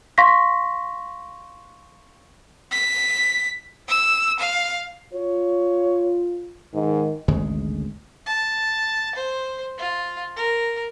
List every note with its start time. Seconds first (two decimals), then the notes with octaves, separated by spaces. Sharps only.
0.18 F5 C6 C#6 A#6 B6
2.72 B6
3.89 E6
4.40 F5
5.13 F4 C#5
6.74 G#2 D#3
7.28 G#1 D2 C#3 G#3
8.26 A5
9.15 C5
9.78 F4
10.36 A#4